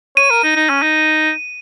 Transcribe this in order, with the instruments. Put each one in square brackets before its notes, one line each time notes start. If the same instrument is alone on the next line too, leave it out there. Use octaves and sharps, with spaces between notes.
[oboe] C#5 [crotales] D#7
[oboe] A#4
D#4
D#4
C#4
D#4